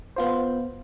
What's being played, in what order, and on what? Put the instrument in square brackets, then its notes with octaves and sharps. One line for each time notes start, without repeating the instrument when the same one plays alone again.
[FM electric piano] B3 F4 C5